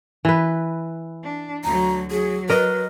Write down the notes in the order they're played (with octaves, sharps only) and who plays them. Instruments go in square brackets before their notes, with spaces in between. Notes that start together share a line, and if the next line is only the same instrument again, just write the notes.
[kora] E3 B4
[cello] D4
[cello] D2 F#3 [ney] A#5
[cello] F#3 [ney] G#4
[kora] A#4 D#5 [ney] B4